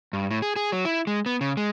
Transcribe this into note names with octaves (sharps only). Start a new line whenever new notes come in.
G2
A2
G#4
G#4
F#3
E4
G#3
B3
C#3
G#3